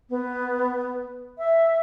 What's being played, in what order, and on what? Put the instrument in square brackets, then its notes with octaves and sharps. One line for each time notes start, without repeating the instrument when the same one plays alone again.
[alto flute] B3
E5